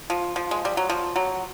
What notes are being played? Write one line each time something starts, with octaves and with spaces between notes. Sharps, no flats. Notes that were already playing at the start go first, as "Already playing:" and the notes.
F3
F3
G#3
G3
F#3
F3
F#3